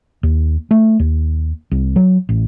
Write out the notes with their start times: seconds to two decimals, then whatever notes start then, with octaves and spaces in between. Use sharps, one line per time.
0.23 D#2
0.71 A3
1.00 D#2
1.71 C2
1.96 F#3
2.29 A1